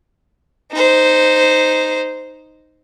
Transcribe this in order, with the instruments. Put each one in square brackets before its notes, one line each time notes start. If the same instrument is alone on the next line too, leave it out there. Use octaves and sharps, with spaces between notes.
[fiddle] D#4 C5